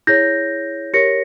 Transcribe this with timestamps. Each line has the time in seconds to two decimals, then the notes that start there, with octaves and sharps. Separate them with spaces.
0.07 E4 G#4 C#5 G6 A#6
0.94 G4 A#4 C#5 A#6 C#7